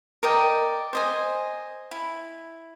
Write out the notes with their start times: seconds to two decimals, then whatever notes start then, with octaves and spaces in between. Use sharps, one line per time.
0.23 A#4 D5 D#5 G5
0.93 C5 D#5 G#5
1.91 E4